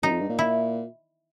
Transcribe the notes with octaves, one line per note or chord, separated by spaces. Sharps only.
F#2 D#4
F2
G2
A#2
E4